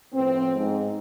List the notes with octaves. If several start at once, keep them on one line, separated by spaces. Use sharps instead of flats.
A2 F3 B3 C4
G#2